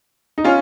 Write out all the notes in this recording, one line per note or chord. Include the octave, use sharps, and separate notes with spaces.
D#4
C#4 F4